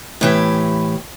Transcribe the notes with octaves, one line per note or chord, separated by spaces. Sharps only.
A2 E3 G4